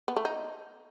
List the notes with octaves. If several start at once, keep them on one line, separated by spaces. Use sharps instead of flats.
B3
A3
D#4